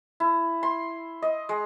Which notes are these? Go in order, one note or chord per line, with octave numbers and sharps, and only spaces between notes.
E4
C6
D#5
G#3